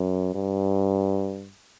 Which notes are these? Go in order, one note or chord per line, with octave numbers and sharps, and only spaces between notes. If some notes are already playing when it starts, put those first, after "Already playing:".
Already playing: F#2
G2